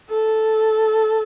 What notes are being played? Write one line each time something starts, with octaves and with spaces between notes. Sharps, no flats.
A4